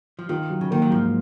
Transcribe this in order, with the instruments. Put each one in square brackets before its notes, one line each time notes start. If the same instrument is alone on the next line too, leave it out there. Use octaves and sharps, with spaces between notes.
[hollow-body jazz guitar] F3
[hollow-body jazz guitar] D#3 [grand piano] F4
[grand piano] F#3
[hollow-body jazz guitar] C#3
[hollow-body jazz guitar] D#3 [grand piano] A#3
[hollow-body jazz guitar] F#3
[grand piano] G#2 [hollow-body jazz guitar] F3